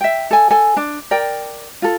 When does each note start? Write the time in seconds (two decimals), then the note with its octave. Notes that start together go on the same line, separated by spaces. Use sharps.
0.01 E5 G5
0.31 A4 G#5
0.51 A4 G#5
0.77 D4
1.11 A#4 D5 G5
1.82 F4 A4